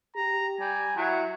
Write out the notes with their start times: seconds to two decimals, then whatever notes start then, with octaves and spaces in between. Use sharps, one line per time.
0.16 G4 A#5
0.60 G3 G#5
0.97 F#3 E4 F#5